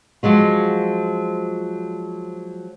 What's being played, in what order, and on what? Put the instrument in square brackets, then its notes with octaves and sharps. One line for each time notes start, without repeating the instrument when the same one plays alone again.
[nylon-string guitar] F3 F#3 G#3 F4